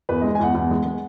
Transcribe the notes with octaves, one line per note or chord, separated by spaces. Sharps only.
E2 B4
G#3 D#5
G#5
E2 F#5
E2 F#5
G#3
G#3